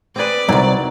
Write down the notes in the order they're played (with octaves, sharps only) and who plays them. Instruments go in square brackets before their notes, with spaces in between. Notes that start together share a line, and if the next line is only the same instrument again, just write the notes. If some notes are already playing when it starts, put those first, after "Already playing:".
[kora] C4 G#4 B4 [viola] D5
[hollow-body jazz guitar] C2 F#2 [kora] D#3 F#3